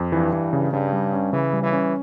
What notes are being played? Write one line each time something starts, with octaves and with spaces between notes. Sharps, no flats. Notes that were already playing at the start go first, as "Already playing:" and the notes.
Already playing: F2
G2 E3
E3
C#3
G2 C#3
G3
C#4
C#3 E3
G3
E3
C#4